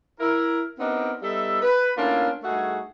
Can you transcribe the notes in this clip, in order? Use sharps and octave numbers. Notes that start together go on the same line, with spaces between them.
E4 A#4
B3 C4 D4 D#4 G4 A#4
G3 B3 D#4 A4 E5
B4
A3 A#3 C#4 D4 E4 F4
G2 A3 D#4 F#4 G#4